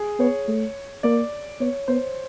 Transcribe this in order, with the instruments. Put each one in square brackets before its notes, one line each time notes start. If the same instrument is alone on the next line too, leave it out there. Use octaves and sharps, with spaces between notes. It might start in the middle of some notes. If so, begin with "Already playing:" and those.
Already playing: [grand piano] G#4
[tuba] B3 [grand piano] C#5
[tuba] A3
[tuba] A#3 [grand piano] D5
[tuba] B3 [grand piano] C#5
[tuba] B3 [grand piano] C5